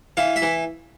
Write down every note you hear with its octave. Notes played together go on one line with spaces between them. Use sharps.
E3 F5
E5
E3